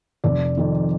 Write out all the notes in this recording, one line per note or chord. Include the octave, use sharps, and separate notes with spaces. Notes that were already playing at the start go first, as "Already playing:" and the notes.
F1 D5
F2 D#3